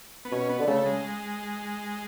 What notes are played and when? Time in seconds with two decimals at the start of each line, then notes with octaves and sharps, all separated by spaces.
0.25 B3
0.32 B2 C#4
0.49 B3
0.59 D3
0.67 C#3 A3
0.86 G#3